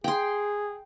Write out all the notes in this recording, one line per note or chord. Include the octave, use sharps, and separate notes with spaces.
G#4 G5 C6